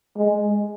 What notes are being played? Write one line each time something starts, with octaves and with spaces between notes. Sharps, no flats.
G#3